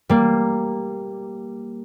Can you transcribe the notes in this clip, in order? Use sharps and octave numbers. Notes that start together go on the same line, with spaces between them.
G3 A#3